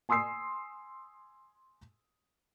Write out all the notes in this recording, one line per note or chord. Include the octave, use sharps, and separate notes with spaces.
G#5 C6 D#6 E6 C7